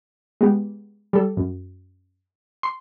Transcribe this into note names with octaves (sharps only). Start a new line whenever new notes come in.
G#3 B3 G4
G3 A4
F#2
C6